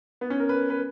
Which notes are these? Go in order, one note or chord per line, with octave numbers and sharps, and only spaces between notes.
B3
C#4
A#4
B4
B4